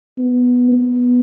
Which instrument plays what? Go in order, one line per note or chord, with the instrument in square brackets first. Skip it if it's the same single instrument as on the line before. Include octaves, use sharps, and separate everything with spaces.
[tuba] B3
B3